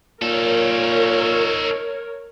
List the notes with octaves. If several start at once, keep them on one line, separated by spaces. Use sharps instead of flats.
A#2 D#4 A4 A#4 C#5